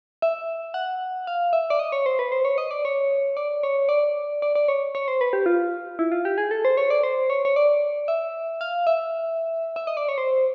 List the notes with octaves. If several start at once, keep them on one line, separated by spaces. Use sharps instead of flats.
E5
F#5
F5
E5
D5
D#5
C#5
C5
B4
C5
C#5
D#5
D5
C#5
D5
C#5
D5
D5
D5
C#5
C#5
C5
B4
G4
F4
E4
F4
G4
G#4
A4
C5
C#5
D5
C5
C#5
C#5
D5
E5
F5
E5
E5
D#5
D5
C#5
C5